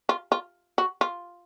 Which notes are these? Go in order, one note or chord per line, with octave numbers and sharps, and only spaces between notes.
F4
F4
F#4
F4